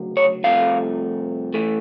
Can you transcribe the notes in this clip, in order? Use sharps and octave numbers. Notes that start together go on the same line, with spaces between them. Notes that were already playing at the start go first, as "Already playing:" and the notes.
Already playing: D2 C#3 F#3
C#5
C2 C3 F3 A3 F5
E3 A3